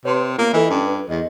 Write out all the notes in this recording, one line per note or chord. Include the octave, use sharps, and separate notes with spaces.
C3 B4 C#5 C6
A#3 B3 F4 D#6
E3 F4 A4 D#5
G2 C#4
B4
E2 D#5